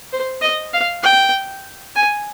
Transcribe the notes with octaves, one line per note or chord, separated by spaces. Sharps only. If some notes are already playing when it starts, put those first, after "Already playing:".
C5
D#5
F5
G5
G#5